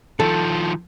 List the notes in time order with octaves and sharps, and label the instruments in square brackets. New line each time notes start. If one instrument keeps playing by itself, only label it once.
[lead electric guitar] D#3 F3 [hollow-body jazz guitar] A4